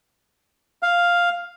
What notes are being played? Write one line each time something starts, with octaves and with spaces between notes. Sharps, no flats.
F5